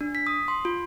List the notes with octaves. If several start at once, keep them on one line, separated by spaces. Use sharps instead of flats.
D4
B6
D#6
C6
F4